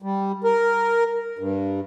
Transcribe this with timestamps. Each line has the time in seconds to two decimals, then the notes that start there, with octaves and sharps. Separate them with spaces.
0.02 G3
0.44 A#4
1.39 G2